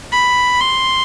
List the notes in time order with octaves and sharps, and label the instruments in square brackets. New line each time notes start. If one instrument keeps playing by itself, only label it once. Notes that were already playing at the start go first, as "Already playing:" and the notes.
[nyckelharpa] B5
C6